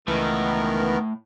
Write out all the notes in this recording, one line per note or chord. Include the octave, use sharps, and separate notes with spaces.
C#2 A2 D#3 E3 B3 A#4